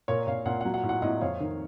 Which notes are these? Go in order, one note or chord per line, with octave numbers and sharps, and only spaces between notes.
A#2 A#4 C#5
A#2 C#5 F5
A#2 F#5
F#5
F#3
F#5
A2
F#5
A2 D#5 F#5
F2 C#5 F5
D#3